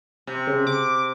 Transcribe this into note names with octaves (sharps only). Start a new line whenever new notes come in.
C3
C#3
D6